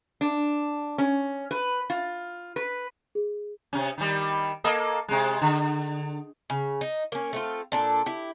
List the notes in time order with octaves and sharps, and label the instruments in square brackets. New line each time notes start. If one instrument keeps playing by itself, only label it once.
[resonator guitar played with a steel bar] D4
C#4
B4
F4
B4
[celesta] G#4
[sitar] C3 C#4
D#3 G3
A#3 A4 D#5
C3 G#3
D3
[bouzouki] C#3
D#4
A#3 C#4
A3 C4 F4
A#2 D4 A4
E4 G4